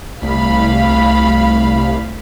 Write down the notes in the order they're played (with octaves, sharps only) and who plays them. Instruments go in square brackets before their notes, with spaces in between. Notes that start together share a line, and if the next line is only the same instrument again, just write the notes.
[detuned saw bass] C2 [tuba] A3 [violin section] F5 B5